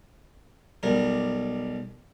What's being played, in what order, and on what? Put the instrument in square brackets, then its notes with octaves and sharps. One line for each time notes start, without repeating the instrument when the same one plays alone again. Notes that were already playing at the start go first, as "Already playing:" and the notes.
[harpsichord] B1 G3 A#4